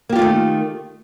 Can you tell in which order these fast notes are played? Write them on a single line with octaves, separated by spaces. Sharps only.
A#3 G4 F4 A3 D#3